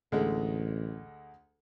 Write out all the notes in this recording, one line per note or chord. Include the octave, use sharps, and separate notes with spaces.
A1 D2 G#3 A3